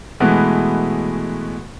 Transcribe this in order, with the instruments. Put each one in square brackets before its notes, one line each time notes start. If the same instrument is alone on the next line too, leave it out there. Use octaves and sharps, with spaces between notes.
[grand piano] B2 E3 G#3 A3 B3 F#4